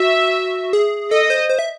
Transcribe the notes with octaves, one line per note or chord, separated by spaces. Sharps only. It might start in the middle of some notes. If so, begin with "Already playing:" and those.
Already playing: F#4 E5
G#4
A4 D#5
C5
C5
E5